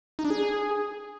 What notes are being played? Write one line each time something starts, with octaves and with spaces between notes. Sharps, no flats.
D#4
D4
G#4